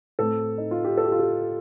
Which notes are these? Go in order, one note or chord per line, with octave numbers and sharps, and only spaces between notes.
A2 A3 C4 A4
D#4
F4
G4
A4
G4
F4
G4